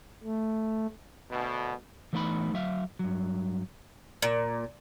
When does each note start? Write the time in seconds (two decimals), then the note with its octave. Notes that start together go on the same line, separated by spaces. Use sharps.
0.23 A3
1.30 D2 B2
2.13 E3 A3 B3 D#4 D#5 B5
2.54 F#3 E5 F5
2.99 G2 F#3
4.22 A#2